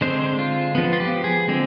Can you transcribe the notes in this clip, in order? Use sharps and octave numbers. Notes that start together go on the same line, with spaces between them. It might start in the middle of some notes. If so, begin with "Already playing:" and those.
D3 G#3 C4 C5
F4
F3 B3
F4
G4
G#4
D3 G#3 C4